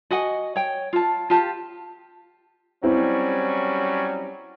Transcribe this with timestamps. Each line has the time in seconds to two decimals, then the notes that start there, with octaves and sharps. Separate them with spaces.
0.11 F#4 D#5 F#5 G#5
0.56 C#5 G5
0.93 F4 A5
1.30 F4 G4 A5
2.84 F#3 G3 C4 C#4 E4